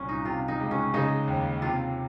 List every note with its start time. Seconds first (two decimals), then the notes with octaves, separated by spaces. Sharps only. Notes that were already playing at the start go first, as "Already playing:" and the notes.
Already playing: C2 A#2 C#4
0.09 D#4
0.25 C3 F4
0.48 D#4
0.60 C#2
0.71 C#4
0.94 C#3 D#4
1.28 D#2
1.62 C3 F4